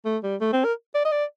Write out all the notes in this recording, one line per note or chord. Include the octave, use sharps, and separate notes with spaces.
A3
G3
A3
C4
A#4
D5
D#5
D5